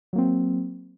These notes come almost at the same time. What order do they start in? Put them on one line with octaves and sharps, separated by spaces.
F#3 A#3 C4